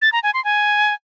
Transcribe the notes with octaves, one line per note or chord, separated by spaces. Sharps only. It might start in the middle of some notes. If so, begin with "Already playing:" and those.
A6
A#5
G#5
C6
G#5